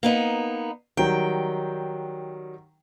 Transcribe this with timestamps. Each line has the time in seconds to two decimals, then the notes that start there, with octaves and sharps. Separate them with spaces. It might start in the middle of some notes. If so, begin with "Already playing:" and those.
0.03 A#3 B3 D#4
0.97 D#3 F#3 G3 G5